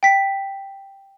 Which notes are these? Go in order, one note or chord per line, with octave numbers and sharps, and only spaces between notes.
G5 B6